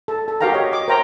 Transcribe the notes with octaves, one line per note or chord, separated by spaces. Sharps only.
A4
A4
F#4 G4 A#4 F5 G5 A#5
G4 C#5 D#5
D#5 D6
A#4 C5 C#5 E5 G5 A#5